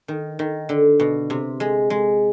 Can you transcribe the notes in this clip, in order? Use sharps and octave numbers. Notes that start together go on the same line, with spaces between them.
D#3
D#3
D3
B2
C3
G#3
G#3